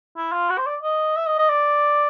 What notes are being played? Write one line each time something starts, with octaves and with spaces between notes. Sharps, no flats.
E4
F4
F#4
C5
D5
D#5
E5
D#5
D#5
D5